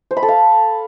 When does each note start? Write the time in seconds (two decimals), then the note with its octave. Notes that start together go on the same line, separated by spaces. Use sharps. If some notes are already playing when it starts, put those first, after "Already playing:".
0.11 C5
0.17 B5
0.23 A4
0.28 F5